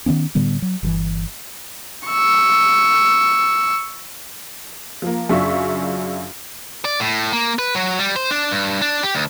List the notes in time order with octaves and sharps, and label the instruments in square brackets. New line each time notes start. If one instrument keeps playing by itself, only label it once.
[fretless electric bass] D#3 F#3 B3 C#4
A2 D3 G3 B3
F#3
G1 D3 E3
[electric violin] C#6 E6
[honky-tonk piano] F3 A#3
F#2 C#3 D4 F4 E5 C#6
[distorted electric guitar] D5
A2
A#3
B4
F#3
G3
C5
D4
G2
D4
G4
D2